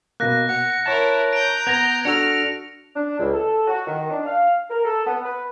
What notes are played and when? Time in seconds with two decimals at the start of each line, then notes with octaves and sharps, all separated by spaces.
0.20 B2 A#3 F#6 A#6
0.49 F#5 C#7
0.86 E4 A#4 C#5 A5
1.33 A#5 G6 D7
1.67 B3 G#6 A#6 F7
2.05 D4 F#4 A4 F6 C#7
2.96 D4
3.18 C#2
3.34 A4
3.67 F#4
3.86 D#3
4.10 D4
4.26 F5
4.69 A#4
4.85 A4
5.07 B3
5.25 B4